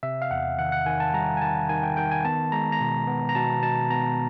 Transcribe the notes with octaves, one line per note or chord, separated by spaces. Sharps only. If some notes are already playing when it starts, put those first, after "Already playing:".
C3 E5
F5
E2 F#5
D#3 F#5
F#5
D#3 G#5
A5
G3 A#5
G#5
D#3 A5
D#3 G#5
G5
D#3 G5
G#5
B3 A5
G#3 A#5
A#5
B2
B3
A#5
B2 A5
B2 A5
B3 A#5